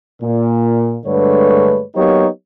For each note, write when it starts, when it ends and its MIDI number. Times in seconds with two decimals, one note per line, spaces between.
0.22 0.97 46
1.06 1.83 43
1.06 1.83 50
1.06 1.83 56
1.06 1.83 57
1.06 1.83 71
1.06 1.83 73
1.96 2.27 54
1.96 2.27 58
1.96 2.27 59
1.96 2.27 63
1.96 2.27 67
1.96 2.27 73